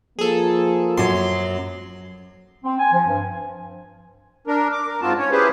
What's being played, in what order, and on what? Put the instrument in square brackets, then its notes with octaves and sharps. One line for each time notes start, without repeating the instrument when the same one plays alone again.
[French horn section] F3 A#3 [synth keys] G#4 A4
[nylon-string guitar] F#2 F#3 [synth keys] C6
[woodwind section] C4
G#5
F3
G2
[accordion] D4 A#4
D6
A#4
G#2 C4 F4 F#4 A5
C#4 C#5
C#4 E4 G4 G#4 B4 C5